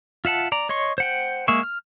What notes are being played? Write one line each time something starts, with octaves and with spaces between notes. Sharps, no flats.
F4 E5 F#5 A5
D5 A#5
C#5 D#5 C6 C#6
C5 F#5 G5
G#3 A#3 G#4 E5 C#6
F6